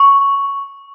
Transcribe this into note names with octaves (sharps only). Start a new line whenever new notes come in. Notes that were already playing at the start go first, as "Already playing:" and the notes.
Already playing: C#6